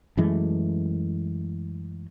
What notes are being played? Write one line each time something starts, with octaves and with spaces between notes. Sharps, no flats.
F#2 E3 G#3 A3